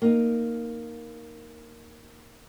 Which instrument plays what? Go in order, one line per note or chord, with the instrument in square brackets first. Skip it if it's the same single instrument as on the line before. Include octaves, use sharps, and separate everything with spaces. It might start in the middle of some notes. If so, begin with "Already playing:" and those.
[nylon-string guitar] A#3 D#4